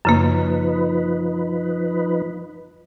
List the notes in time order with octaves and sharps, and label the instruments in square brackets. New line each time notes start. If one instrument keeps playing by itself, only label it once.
[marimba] F#2 C#3 A#3 [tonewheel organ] F3 D#4 B4